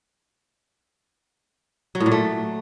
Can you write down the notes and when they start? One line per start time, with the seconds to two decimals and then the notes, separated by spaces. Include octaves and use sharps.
1.95 F#3
2.00 A2
2.06 A#2
2.12 A3